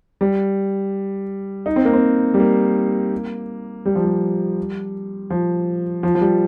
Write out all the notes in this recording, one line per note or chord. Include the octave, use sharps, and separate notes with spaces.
G3
D#4
C4
A#3
C4
G3
A#3
G3
F3
G3
F3
F3
F3
G3